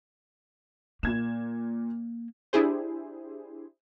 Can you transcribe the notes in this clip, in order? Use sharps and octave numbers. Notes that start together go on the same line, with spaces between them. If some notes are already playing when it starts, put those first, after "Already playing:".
A#2 A#3 G#6 E7
D4 E4 G4 G#4 C5